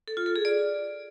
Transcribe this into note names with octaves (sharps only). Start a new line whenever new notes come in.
A4
F4
A4
G#4
D5